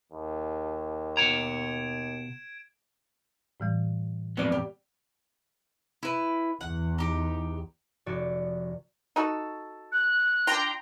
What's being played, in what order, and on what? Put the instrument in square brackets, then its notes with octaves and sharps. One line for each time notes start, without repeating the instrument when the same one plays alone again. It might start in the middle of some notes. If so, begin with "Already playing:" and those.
[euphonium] D#2
[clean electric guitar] B2 F#5 A#5 [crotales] G#6 D7 E7
[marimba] A2 E3 G3
[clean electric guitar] F2 B2 F#3 [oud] B3 D5
[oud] G4
[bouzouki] E4 B4
[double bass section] E2 [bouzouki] F#5
[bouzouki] D#4 G4
[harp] F1 F#4 D5
[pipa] D#4 F#4 A4
[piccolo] F#6
[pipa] D4 F4 [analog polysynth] G5 A#5 C6